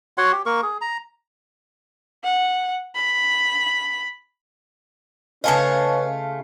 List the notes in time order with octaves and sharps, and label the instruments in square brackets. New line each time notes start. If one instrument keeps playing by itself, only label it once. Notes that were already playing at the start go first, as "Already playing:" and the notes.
[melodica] F#4 C#5 F#5 C6
G4
A#3 A#4 C#6
G#4
A#5
[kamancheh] F#5
B5
[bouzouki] C#3 A3 F4 [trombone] C#4 [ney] B4 [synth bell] D#5 G#5 A5